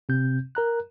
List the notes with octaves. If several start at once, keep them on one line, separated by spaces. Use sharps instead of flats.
C3 C4 G6
A#4 A#5 F#6